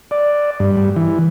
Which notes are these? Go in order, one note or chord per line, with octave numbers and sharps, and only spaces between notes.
D5
G2
G3
E3